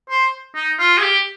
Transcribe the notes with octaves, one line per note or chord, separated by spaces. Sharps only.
C5
D#4
F4
G#4
G4